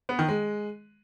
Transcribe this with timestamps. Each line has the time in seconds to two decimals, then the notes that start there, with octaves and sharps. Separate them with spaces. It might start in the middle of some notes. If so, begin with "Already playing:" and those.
0.09 B3
0.19 D#3
0.28 G#3